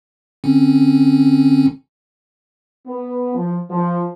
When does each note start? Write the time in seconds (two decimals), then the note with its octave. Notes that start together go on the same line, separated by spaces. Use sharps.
0.44 D3 C4 C#4
2.87 B3
3.35 F3
3.71 F3